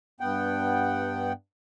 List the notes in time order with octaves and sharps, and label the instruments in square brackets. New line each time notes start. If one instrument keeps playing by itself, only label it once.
[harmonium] G2 B3 F#5 G5